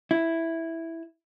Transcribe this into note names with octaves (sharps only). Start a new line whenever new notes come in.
E4